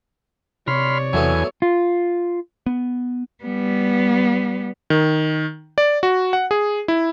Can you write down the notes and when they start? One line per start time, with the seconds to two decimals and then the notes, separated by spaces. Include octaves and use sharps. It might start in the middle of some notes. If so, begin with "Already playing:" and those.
0.67 C3 C#5 D5 B5 C6 F6
1.13 E2 F#3 A3 B3 G#5
1.62 F4
2.66 B3
3.44 G3 B3
4.90 D#3
5.78 D5
6.03 F#4
6.33 F#5
6.51 G#4
6.88 E4